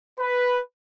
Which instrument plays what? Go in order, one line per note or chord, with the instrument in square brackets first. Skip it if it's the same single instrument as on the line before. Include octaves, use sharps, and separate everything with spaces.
[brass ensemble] B4